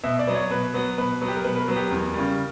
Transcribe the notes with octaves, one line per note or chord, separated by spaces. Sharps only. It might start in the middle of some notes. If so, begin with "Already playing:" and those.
B2 E5
D5
F#3 B3
C#5
B2 B4
F#3 B3
B2 B4
F#3 B3
G4
A#4
B2 B4
B4
A#4
F#3 B3
G4
E2 A#4
C#3 G3